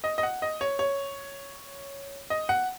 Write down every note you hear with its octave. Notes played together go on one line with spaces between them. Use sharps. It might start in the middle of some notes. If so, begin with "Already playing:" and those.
D#5
D#5
F#5
D#5
C#5
C#5
D#5
F#5